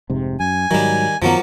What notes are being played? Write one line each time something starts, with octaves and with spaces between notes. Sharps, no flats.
F1 G#2 C3
F#2 G#5
G#2 D#3 F#3 G3
F#2 D#3 F3 F#3 A#3 B3